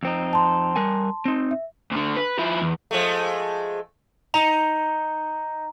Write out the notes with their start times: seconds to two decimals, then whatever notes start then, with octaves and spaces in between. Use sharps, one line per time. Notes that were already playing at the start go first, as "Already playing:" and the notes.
0.03 F2 C4 D#4
0.33 A5 C6
0.76 G3 A#4 G#5
1.25 C4 D#4
1.51 E5
1.91 D2 D3
2.17 B4
2.39 F3 E4
2.62 E2
2.91 F3 G#3 A3
4.34 D#4 A#5